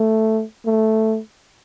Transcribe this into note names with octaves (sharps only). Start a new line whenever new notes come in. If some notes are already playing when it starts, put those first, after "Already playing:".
Already playing: A3
A3